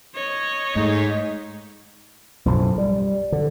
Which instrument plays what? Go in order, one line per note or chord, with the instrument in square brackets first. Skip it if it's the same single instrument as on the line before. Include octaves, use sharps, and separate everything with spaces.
[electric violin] C#5 D#5
[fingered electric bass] G#2 [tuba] A3 [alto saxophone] D#4
[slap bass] B1 F#2 A2 F3
G3
D3